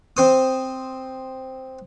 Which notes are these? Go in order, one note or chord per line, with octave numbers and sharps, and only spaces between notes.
C4 C5 D#6